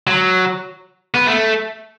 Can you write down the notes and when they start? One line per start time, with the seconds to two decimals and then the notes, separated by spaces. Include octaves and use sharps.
0.07 F#3
1.14 B3
1.27 A3